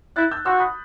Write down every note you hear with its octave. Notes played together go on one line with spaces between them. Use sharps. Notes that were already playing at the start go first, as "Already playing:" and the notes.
E4 F#6 A6
E6 G6
F#4 C6 E6
B5 D#6